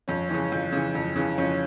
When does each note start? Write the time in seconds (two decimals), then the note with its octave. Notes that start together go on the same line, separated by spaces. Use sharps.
0.08 F2 C#4
0.29 C#3 E3 C#4
0.52 F2
0.72 C#3 E3
0.95 F2
1.16 C#3 E3
1.38 F2 C#4